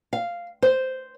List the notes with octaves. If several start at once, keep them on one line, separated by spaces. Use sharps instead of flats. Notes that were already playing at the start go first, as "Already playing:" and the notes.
F5
C5